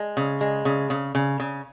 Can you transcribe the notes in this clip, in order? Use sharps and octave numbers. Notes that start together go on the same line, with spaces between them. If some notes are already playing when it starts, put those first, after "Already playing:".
Already playing: G#3
C#3
G#3
C#3
C#3
C#3
C#3